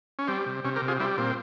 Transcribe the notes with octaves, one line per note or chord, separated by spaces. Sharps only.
C#4
G3 C4
C3
C3 C#4
G4 A#4
C3
F4 G#4
G3 C4 E4
A#2 C4